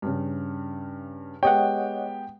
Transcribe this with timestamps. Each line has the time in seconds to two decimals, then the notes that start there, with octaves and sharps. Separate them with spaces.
0.02 G2 C#3
1.43 G#3 B3 G4 C#5 D#5 F#5 G5